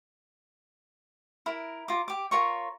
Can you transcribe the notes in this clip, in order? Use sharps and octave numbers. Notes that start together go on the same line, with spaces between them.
E4 A#4
F4 A#5 D6
G4 D6
F4 A#4 C#5 C#6